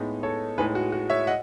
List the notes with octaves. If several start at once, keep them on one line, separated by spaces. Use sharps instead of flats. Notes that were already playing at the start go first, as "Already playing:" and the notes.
Already playing: A2 G#3 B3 D#4
A4 C#5
A2 G#3 D#4 G#4 B4
F#4
F#4
C#5 E5
D#5 F#5